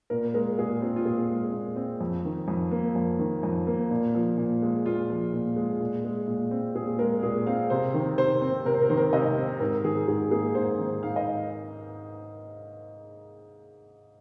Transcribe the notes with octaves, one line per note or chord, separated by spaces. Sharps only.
A#2 A#4
G#3 A#4
A#2 G#4
C4 F4
F4
A#2 G#4
G#3
A#2
C4
F2
D#3
F2
A#3
F2
D#3
F2
A#3
A#2
F3
A#2
G#3
A#2 F4
F3
A#2
G#3
A#2
G#3
A#2
C4
A#2 G#4
G#3 A#4
A#2 G#4
C4 F5
C3 C5
D#3
C3 C5
C4
C3 A#4
C5
A#4
D#3 C5
A#4
C3 D#5
C4
G#2 A#4
D#3 G#4
G#2 G#4
A#3 G#4
G#2 C5
D#3
G#2 F5
D#5